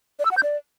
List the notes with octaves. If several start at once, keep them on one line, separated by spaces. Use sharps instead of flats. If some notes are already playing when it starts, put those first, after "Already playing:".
D5
E6
F#5
G6
D5